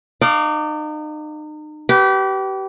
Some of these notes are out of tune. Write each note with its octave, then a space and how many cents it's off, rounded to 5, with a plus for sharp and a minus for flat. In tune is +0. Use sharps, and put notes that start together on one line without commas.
D#4 -35 D5 -10 F5 +0
G4 -30 B4 +0